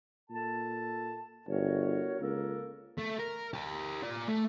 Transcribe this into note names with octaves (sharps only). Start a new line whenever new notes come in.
A#2 A4 A5
G1 F#4 A#4 C#5
C#2 A#3 A4 A#4
A3
A#4
G4 A#4
F4 D5
A3